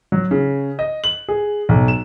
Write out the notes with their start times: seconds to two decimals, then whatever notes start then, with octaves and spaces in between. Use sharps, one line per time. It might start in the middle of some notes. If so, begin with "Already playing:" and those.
0.12 F#3
0.31 C#3
0.79 D#5
1.04 F#7
1.29 G#4
1.69 B1
1.88 E7